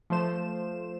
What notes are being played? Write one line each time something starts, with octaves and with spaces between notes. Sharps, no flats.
F3 A3 C5 E7